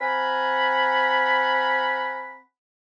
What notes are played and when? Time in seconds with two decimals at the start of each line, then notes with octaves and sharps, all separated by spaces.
0.01 C4 F5 F#5 G#5 A#5 B5